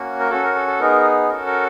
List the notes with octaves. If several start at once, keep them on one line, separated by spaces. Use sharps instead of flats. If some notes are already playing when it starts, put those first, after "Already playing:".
Already playing: A#3 C#4 F#4
A#4
C#4 F#4 A4
A#4
A4
A4
B3 D#4 G#4 A#4
C#4 F#4 A4 A#4
A#4